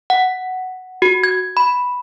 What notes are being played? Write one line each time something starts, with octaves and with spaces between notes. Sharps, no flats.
F#5
F#4
G#6
B5